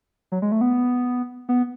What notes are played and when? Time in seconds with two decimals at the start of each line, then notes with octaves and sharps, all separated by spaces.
0.32 F#3
0.42 G#3
0.52 A3
0.61 B3
1.49 B3